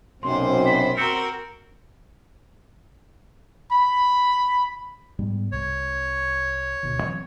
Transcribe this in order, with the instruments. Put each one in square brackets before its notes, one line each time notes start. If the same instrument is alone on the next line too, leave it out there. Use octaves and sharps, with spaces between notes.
[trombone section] B1 F#2 C4 [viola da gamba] C3 C5 [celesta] C6
[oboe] B5
[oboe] C4 [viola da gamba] F#4 A#4 [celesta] A#5 C#7
[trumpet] B5
[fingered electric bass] G#2 G3 B3
[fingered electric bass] C2 C3 [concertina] C#5
[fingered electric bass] D2 B2 D#3
E3 F#3 C4